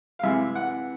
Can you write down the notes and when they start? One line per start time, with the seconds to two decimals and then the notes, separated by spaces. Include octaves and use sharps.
0.19 F5
0.23 C3 E3 G#3 E5
0.55 F#5